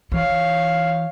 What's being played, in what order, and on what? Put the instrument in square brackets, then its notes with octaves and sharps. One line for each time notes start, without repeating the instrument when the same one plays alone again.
[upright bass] E3 [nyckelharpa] C#5 F5